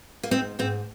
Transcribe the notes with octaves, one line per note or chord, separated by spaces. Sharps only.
A#3
G#2 C4
G#2 C4